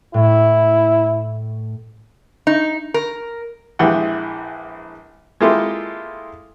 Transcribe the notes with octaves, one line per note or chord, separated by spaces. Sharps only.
A2 E4
D#4
A#4
A#1 E3 G#3 G4 F#5 G5
G#3 A#3 E4 F4 G4 A4